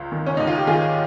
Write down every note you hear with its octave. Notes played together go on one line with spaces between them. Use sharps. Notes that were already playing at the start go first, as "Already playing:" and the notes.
Already playing: C#2
D#3
C#4
D#2 D#4
F4
G4
D#3 F4 G#4